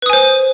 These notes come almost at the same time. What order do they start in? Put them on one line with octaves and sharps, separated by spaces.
B4 D#6 G#5 C5